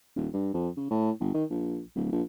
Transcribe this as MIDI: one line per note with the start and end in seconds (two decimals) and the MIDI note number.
0.16 0.28 27
0.33 0.52 43
0.54 0.69 41
0.77 0.89 49
0.90 1.11 45
1.20 1.33 31
1.34 1.44 51
1.50 1.81 34
1.96 2.08 26
2.12 2.23 34